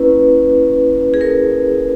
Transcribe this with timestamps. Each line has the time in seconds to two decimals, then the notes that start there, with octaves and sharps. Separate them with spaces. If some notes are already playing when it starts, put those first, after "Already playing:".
Already playing: A#3 C#4 E4 B4
1.14 G#4
1.21 A#4